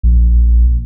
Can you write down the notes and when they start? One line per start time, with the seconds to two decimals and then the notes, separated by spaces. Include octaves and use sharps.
0.03 A#1